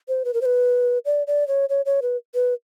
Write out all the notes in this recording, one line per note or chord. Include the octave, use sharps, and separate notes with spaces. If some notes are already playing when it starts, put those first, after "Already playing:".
C5
B4
A#4
C5
B4
D5
D5
C#5
C#5
C#5
B4
B4